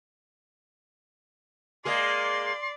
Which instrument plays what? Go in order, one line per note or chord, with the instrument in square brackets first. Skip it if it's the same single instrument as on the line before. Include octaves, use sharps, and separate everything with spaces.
[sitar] G#3 A#3 G#4 [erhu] D5 [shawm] C6